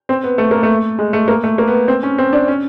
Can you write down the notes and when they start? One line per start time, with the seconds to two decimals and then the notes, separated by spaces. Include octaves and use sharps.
0.09 C4
0.24 B3
0.38 A3
0.51 A#3
0.63 A3
0.99 G#3
1.13 A3
1.28 A#3
1.44 A3
1.58 A#3
1.68 B3
1.88 C4
2.03 C#4
2.18 C4
2.33 D4
2.48 C#4